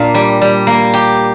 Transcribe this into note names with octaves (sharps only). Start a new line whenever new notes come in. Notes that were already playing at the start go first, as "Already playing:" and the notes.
Already playing: A#2 A#3 D4
G3
G3
A#3
G4